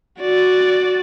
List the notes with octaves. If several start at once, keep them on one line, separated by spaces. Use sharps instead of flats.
F#4 D5